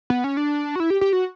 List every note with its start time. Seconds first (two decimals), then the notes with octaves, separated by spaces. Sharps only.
0.10 B3
0.24 C#4
0.37 D4
0.76 F#4
0.80 E4
0.90 G4
1.01 G4
1.13 F#4